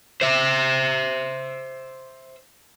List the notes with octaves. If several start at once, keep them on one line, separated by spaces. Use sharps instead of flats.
C5 E5